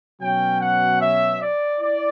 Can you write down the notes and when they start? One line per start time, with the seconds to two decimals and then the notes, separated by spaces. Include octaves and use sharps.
0.20 B2 F#3 C#4 G5
0.60 F#5
1.01 E5
1.40 D5
1.81 E4 D5